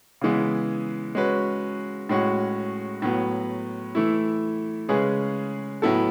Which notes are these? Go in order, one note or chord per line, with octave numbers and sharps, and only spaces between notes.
C#3 E3 G#3 B3
G#3 C#4 F#4 B4
A2 G#3 C#4 F#4
A2 F#3 B3
E3 A3 E4
C#3 G#3 C#4 G#4 B4
A2 F#3 B3 E4 A4